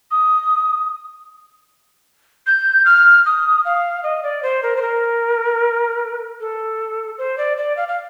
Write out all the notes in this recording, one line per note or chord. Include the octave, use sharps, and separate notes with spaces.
D#6
G6
F6
D#6
F5
D#5
D5
C5
A#4
C5
A#4
A4
C5
D5
D5
F5
F5